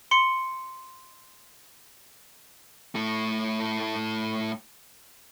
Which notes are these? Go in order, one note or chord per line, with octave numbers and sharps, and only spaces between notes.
C6 C#7
A2 A3